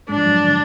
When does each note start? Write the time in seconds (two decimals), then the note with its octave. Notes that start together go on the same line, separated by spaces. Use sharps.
0.09 G#2 G#3 D4
0.17 F3
0.25 F#2 F#3
0.42 D3